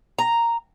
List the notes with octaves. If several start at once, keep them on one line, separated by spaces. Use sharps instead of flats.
A#5